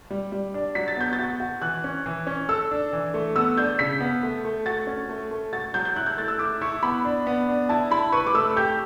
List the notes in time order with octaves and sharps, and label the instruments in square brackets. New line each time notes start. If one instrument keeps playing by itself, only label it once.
[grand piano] G3
G3
D4
[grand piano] F#3 [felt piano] B6
[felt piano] A6
[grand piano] B3 [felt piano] G6
[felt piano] A6
[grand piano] F#4
F#4
[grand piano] E3 [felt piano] F#6
[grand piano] C#4
E3
C#4
[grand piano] A4 [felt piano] E6
[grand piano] D4
E3
A3
[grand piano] B3 [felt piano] E6
[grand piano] D4 [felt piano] G6
[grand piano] C#3 [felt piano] B6
[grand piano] B3
A3
A3
[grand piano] F#4 [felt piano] A6
[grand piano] C#4
A3
A3
[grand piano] F#4 [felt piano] A6
[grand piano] F#3 [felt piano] G6
[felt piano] G6
[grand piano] E4 [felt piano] F#6
[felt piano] G6
[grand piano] A3 [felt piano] A6
[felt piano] E6
[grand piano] E4 [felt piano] D6
[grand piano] E4 [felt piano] C#6
[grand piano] B3 [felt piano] B5
[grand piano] D4
B3
D4
[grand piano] E4 [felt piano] A5
[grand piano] E4 [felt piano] B5
[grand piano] B4 [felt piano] C#6
[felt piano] D6
[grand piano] A3 [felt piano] E6
[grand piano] G4 [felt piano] G6